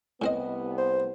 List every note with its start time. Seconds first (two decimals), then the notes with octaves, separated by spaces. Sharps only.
0.22 C2 A2 B3 C4 D#5
0.78 C5